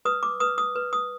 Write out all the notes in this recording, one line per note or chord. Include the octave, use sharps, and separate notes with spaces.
B4 D#6
D6
B4 D#6
D#6
B4
D#6